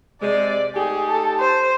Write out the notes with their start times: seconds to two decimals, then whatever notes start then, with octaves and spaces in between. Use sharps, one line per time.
0.22 C3 G#3 D5
0.76 A3 D#4 G4 G#4
1.10 A4
1.40 C5